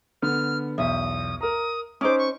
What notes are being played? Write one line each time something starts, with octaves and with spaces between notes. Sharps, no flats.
D3 B3 F6
B1 E2 E5 D#6
A#4 A#5 D#6
C#4 D#4 C5 D6 D#6
C#6